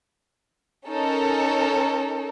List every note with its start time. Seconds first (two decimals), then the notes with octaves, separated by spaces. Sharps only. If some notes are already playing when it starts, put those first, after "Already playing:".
0.86 C#4 D#4 A4 A#4